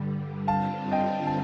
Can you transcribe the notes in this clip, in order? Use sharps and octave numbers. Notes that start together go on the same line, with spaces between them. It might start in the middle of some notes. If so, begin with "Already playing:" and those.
Already playing: G2 D3 G3
G2 D3 G3 C4 F4 F5 A5
D#5 G5
A5